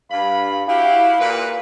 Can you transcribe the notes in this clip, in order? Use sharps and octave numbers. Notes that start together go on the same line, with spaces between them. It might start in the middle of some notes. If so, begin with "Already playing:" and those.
G2 F5 B5
E4 F#4 G4 F5
A#2 B4